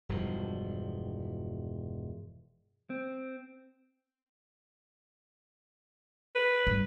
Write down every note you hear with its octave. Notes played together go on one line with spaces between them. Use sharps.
E1 G2 F3
C4
B4
G2